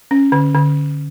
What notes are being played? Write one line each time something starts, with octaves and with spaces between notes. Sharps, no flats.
C#4
D3
D3